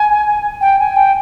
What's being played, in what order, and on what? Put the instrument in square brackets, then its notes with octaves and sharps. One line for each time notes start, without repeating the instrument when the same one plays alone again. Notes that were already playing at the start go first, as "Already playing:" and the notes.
Already playing: [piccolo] G#5
G5
G#5
G5